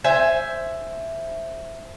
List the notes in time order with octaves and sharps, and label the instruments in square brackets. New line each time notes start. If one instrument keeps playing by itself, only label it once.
[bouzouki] C5 E5 G#5